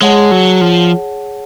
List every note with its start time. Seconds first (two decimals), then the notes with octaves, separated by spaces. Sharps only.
0.01 G#3 G#4 C#5 F#5 A5
0.31 F#3
0.61 F3